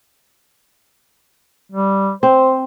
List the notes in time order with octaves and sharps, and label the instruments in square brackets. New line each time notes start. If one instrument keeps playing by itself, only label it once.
[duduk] G3
[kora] C4 [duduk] C5